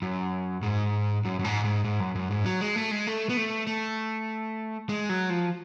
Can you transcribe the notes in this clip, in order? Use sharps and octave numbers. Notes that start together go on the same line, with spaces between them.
F#2
G#2
F#2
F#2
G#2
G#2
G#2
F#2
F#2
G#2
F#3
G#3
A3
G#3
A3
B3
A3
A3
G#3
F#3
F3